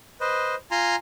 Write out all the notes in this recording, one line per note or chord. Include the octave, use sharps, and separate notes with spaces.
B4 C5 D#5
F4 G#5 A#5 C6